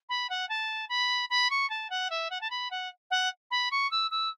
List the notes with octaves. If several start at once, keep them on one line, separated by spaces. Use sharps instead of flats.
B5
F#5
A5
B5
B5
C#6
A5
F#5
E5
F#5
A5
B5
F#5
F#5
B5
C#6
E6
E6